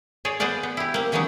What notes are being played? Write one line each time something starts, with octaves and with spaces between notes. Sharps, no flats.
G#4 C#5 D5
B3 G#4 C5 D5 F5
B3
E4 G4
A#3 C4
C#3 E3 F#3 G#3 B3 D#4